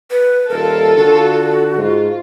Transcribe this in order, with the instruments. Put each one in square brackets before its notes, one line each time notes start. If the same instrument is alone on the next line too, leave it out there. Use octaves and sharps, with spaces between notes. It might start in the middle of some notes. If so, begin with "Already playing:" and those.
[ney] B4
[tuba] D#1 [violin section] F4 A4 [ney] A#4
[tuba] D3 [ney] F#4
[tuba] G#2 [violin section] F4